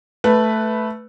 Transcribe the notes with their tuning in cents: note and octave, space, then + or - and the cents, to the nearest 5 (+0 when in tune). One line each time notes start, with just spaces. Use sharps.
A3 +0 B4 +0